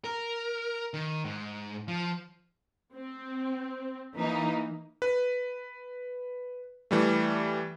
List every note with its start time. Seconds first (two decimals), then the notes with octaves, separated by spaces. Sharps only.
0.04 A#4
0.94 D#3
1.25 G#2
1.88 F3
2.95 C4
4.16 E3 A#3 D#4
5.02 B4
6.91 E3 G3 A3